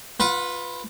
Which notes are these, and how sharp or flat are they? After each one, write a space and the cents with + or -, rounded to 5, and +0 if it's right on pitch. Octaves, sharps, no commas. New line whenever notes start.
F4 +15 B4 +0 F#5 -25